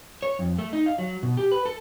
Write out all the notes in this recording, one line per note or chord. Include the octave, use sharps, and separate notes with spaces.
C#5
F2
A3
D#4
F5
F#3
B2
G4
B4
A4